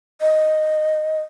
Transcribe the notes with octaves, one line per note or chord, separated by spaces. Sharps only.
D#5